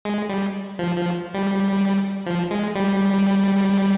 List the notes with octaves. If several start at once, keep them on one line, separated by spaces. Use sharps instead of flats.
G#3
G3
F3
F3
G3
F3
G#3
G3